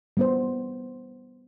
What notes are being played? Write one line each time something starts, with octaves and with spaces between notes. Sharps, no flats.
G3 B3 C5